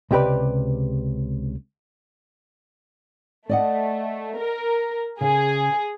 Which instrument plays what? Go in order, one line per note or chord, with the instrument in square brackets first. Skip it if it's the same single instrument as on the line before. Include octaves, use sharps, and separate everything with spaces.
[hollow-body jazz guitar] C#2 C3 G4 B4 D5
[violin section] A3 [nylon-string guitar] D5 D#5 F#5
[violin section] A#4
[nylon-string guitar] C#3 [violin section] G#4